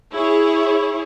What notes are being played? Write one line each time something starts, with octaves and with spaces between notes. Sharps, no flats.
E4 G#4 C#5